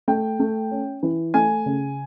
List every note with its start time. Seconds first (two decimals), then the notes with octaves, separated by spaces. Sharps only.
0.08 A3 G5
0.40 A3
0.71 C#4
1.03 E3
1.34 A3 G#5
1.66 C#3